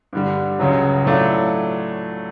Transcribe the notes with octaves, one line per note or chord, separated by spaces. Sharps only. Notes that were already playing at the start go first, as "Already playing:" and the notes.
G2 D3 G3
C#2 C#3 F#3
A2 F#3 A3 D4 F4